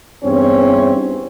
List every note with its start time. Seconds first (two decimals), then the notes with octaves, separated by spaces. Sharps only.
0.23 E2 G2 E3 C4 C#4